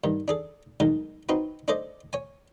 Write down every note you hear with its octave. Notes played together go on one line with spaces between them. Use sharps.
G2 D#3
D4 G#4 A4
B1 D#3 G#3 D#4 A#4
C4 D#4 F#4 B4
D4 A4 C5 D5 D#5
C#5 G#5